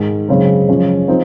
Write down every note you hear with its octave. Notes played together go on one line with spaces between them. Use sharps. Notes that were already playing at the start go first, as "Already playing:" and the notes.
Already playing: G#2 D#3 G#3
F#2 C#3 G#3 C4
F#2 C#3 F3 G#3 C#4
F3 C4 D#4